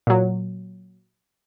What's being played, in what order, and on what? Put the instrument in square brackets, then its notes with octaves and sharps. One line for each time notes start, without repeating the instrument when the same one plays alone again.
[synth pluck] A#2 F#3